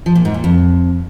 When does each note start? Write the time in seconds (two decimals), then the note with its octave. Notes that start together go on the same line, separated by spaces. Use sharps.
0.06 F3
0.15 A#2
0.25 G#2
0.34 A#2
0.44 F2